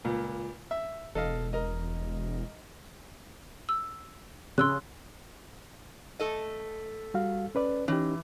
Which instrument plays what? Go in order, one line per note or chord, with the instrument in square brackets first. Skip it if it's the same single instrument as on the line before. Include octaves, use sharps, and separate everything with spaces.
[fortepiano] C#2 A#2
E5
[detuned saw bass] E1 [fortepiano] A4 D#5 F5
[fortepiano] A#4 D#5
[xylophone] E6
[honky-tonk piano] C#3 [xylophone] C6 E6 F#6
[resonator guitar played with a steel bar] A3 A4 D#5
[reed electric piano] G3 F#4 F5
C#4 B4 D5
[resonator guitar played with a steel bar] E3 [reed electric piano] C#4 D#4 G4